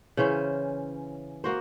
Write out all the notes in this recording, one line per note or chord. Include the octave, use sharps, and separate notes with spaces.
C#3 E3 C#4 C5
A#3 F#4 C5